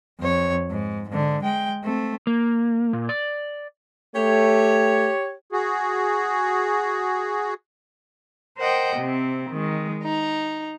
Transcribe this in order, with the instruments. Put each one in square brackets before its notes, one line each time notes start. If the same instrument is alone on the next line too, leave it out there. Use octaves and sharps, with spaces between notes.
[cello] F2 C#5
G#2
G#2 D3
G#3 G5
A3 C4
[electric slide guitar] A#3
A#2
D5
[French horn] A3 [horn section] G4 C#5
[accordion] F#4 G#4
[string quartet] A#4 C5 D#5 F#5 G5
C3 C4
D#3 G#3
D#4